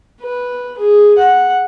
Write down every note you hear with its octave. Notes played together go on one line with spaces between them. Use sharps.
B4
G#4
F#5